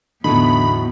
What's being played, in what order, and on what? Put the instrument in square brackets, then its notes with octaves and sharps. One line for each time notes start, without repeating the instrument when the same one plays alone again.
[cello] E2 B3 [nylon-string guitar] A2 F#3 D#4 [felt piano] D3 [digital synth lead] B5